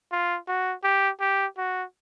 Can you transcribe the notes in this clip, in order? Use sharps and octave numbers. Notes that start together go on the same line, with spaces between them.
F4
F#4
G4
G4
F#4